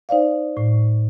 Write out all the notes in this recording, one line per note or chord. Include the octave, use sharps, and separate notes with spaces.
D#4 C5 D5 F5
A2